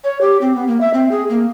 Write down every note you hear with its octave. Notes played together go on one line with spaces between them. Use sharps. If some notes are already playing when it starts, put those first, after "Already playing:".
C#5
G4
C4
B3
A#3
E5
C4
G#4
A#3